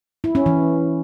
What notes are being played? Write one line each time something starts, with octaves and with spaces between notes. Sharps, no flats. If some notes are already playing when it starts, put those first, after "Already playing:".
E4
C#4
E3